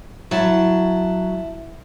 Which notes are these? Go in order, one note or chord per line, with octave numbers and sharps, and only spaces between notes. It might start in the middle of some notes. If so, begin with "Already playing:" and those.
F#3 E4 A5